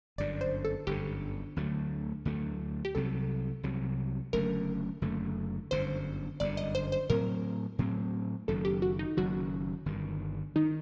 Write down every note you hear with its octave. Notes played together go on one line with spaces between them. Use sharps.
G1 F#2 D3 D5
C5
A4
G1 F#2 D3 G4
D2 D3 F#3 A3
D2 D3 F#3 A3
G4
C2 C3 F#3 A4
C2 C3 F#3
F#1 F#2 D3 A3 A#4
F#1 F#2 D3 A3
G1 F#2 D3 C5
G1 F#2 D3 D5
D#5
C5
C5
A2 F#3 C4 A#4
A2 F#3 C4
F#1 F#2 D#3 F#3 A4
G4
F#4
D#4
F#1 F#2 D#3 F#3 F#4
G1 G2 D#3
D#3 D#4